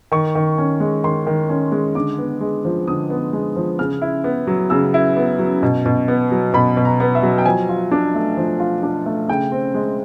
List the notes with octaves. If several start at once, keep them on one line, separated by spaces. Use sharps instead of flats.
D#3 C#6
D#3
C#4
G#3
D#3 C6
D#3
C#4
G#3
D3 D6
B3
G#3
F3
D3 D#6
B3
G#3
F3
C#3 F6
E4
B3
F#3
C#3 E6
E4
B3
F#3
B2
B2
B3
F#3
B2 B5
B2
A#5
B3
E5
F#3
G5
F3 G#5
F4
D4
A3
F3
F4
D4
A3
C#3 G5
C4
G#3